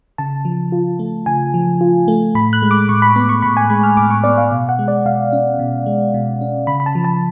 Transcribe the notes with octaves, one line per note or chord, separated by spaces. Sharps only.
C#3 A5
F3
F4
A3
C#3 G#5
F3
F4
A3
A2 B5
F#6
G#3
D6
A2 C#6
B5
B3 B5
C#6
A2 B5
G#5
G#3 B5
F6
A2 D6
C#6
B3 D5
F5
B2
F#5
G#3
D5
B2 F5
C#4
B2
G#3
B2
C#4
C#3 B5
B5
A5
F3
A5